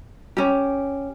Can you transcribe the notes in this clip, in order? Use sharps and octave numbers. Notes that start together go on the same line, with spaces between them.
C#4 G4